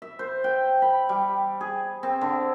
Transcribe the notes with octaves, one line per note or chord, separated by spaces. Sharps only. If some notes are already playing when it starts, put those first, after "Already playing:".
E5
C5
G5
B5
G3
G#4
C4
D3